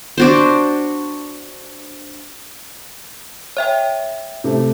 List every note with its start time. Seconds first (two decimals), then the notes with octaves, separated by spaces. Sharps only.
0.18 D4 F#4 C5
3.57 C#5 E5 G5
4.44 C3 A3